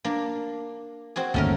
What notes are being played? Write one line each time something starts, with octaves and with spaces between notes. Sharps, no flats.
A#3 D4
C4 F#4 G#4
G1 D#2 A3 A#3 C#4 A#4